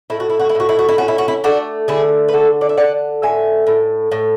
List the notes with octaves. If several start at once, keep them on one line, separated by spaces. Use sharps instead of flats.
A2 E4
F#4
E4
F#4
E4
A2 F#4
E4
F#4
E4
C#4 F#4
E4
F#4
E4
A3 D4 F#4
D3 E4 G#4
B4
D3 F#4 A4
D5
E5
D3 D5 F#5
A2 E5 G#5
A2
A2